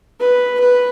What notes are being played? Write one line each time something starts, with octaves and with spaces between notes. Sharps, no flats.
B4
B4